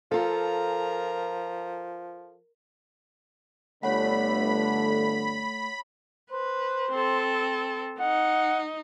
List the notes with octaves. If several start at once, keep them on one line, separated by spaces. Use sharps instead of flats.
F3 F4 A4 A#4 A#5
G1 D3 A3 C#5 F#5 B5
B4 C5
C4 A4
D#4 F#5